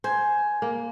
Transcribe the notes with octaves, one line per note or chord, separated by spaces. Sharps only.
C5 G#5
A#3